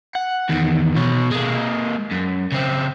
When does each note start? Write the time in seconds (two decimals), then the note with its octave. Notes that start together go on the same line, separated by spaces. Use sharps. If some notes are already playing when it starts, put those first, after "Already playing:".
0.15 F#5
0.49 E2 D#3
0.96 B2 C#5
1.31 G#3 A#3
2.11 F#2
2.52 C#3 C4